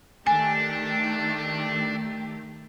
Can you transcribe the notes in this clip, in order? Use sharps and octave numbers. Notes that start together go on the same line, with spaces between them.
D#3 A3 D4 G4 G#5